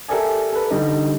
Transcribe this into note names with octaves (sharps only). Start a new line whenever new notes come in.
G4 A4 A#4 D5 E5 G#5
A4 B4
D3 G3 D#4